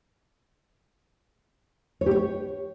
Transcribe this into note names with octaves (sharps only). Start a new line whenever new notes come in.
C#5
G4
C#5